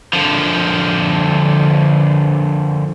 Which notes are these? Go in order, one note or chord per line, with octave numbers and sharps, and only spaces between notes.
D3 F3